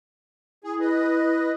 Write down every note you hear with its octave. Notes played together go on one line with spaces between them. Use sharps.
E4 G#4
B4 D#5